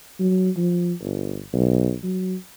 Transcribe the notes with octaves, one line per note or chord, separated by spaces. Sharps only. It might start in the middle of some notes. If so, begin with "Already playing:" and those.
F#3
F3
G1
B1
F#3